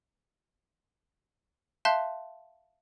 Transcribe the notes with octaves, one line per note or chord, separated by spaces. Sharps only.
E5 F5 A5 C6 F#6 G6